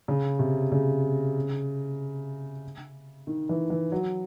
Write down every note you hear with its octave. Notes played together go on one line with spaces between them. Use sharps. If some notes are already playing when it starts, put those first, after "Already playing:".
C#3
C3
C#3
D#3
E3
E3
F#3